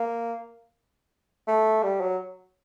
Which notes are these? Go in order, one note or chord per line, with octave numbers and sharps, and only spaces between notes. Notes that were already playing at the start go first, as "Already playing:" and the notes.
Already playing: A#3
A3
G3
F#3